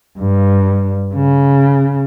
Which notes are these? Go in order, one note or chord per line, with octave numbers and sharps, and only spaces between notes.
G2
C#3